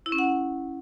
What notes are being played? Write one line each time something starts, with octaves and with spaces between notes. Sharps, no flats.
E4
C#4
F#5